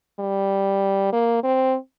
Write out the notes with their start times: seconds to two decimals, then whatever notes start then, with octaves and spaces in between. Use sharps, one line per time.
0.19 G3
1.12 A#3
1.43 C4